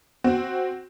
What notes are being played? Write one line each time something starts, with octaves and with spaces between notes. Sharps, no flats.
C4 F#4